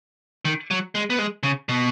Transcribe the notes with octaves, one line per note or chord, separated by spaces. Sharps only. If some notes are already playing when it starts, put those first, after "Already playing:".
D#3
F#3
G#3
B3
G#3
C#3
B2